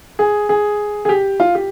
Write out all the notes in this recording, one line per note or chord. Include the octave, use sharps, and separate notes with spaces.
G#4
G#4
G#4
G4
F4
G4